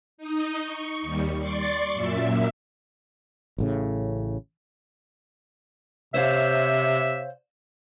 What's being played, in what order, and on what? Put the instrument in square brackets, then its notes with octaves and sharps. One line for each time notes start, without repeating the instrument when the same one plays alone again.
[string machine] D#4 D#5
C#6
D#2 G3
D5 C6 C#6 A6
F#2 A#2 E5
[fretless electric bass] A1 A2 C#3
[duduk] C3 [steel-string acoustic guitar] C5 C#5 F5 [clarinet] E5